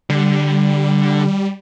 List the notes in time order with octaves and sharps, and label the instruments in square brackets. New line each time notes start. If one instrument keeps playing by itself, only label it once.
[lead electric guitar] D3 [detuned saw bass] G3